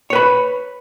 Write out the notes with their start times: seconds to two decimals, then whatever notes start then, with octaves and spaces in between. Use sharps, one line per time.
0.10 C#5
0.13 B4
0.15 B5